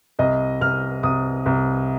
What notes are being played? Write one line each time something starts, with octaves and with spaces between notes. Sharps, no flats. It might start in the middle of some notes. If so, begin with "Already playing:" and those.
C2 D#5
C2 F6
C2 D#6
C2